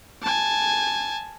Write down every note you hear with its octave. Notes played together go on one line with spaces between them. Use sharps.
G#5 A5